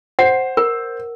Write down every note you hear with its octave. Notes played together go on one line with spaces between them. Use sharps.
C5 F#5
A#4